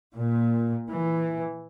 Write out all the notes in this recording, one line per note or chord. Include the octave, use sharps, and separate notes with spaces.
A#2
E3